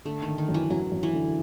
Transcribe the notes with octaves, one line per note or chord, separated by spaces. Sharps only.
D3 A3
D#3
D3
D#3
F#2
E3
F#2 F#3
F#2
E3
D3